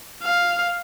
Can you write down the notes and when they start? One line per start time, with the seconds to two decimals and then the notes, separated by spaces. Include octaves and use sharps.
0.23 F5